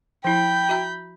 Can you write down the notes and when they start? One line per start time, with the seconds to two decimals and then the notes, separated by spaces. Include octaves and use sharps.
0.24 F3 E4 G5 B5 G6
0.69 F#4 E5 A#5